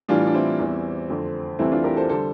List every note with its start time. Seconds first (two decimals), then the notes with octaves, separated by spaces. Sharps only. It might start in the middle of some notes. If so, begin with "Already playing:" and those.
0.08 A2 E3 G3 D4 F4
0.27 D4
0.34 C4 E4
0.59 E2 E3 G3
1.10 F2 D3 A3
1.59 C2 C3 E3 A3 C4 E4
1.72 D4 F4
1.84 G4 A#4
1.96 A4 C5
2.09 D3 G3 A4 C5